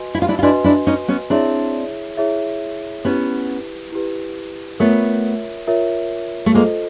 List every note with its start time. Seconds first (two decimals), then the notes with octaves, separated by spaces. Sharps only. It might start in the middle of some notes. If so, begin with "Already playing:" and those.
Already playing: F#4 B4 D#5 G#5 C6
0.15 E4
0.22 F4
0.28 D4 E4
0.39 F4
0.43 D4 E4 F#4 B4 D#5 G#5 C6
0.64 D4 E4
0.87 C#4 D#4
1.08 B3 C#4
1.30 C4 D4 E4 G#4 C#5 E5
2.17 E4 G#4 C#5 E5
3.05 B3 C#4 E4 G4 B4
3.92 E4 G4 B4
4.80 A3 B3 F4 A#4 C#5 E5
5.68 F4 A#4 C#5 E5
6.46 A3
6.54 G#3 A#3 F4 A4 C5 D#5